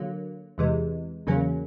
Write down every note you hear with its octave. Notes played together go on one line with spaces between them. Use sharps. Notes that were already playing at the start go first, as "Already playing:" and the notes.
Already playing: D3 F#3 A#3
E2 C3 E3 G#3
E2 C#3 F#3 A#3 C#4